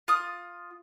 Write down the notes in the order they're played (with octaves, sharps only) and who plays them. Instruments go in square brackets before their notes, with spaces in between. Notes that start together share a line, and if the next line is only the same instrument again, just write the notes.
[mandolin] F4 D#6